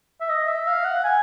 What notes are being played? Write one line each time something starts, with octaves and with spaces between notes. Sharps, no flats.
E5
D#5
E5
F5
F#5
G#5